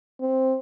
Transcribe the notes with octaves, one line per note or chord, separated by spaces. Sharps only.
C4